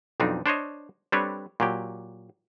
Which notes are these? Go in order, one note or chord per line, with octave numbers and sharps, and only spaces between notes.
B1 F2 C4 D4 D#4
D4 C5 C#5 D#5
G3 C4 D4 A4 B4 C#5
A#2 F#3 G4